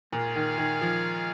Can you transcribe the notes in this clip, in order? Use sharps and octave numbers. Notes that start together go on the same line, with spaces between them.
A#2 G#3 F4 G#4 C#5 F5
D#3
D#3
F3